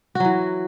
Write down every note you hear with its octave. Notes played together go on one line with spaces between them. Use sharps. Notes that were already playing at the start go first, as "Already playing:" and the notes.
E3 F#3 F#4